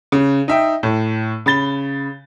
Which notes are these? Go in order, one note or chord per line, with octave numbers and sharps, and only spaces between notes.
C#3
D#4 E5 G5
A2
C#3 B5 A6 G7